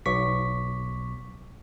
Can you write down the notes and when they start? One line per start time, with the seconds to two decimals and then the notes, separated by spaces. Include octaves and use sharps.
0.06 B1 C#6 D6 B6